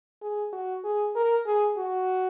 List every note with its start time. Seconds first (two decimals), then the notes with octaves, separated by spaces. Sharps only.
0.22 G#4
0.53 F#4
0.84 G#4
1.16 A#4
1.47 G#4
1.77 F#4